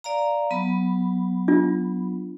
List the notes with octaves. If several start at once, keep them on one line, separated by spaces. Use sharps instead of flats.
D5 F5 A#5
F#3 B3 B5
D4 F4